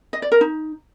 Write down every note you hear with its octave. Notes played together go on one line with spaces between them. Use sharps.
D#5
D5
A#4
D#4